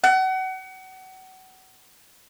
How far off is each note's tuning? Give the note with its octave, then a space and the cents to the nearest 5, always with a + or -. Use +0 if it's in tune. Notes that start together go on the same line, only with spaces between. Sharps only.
F#5 +30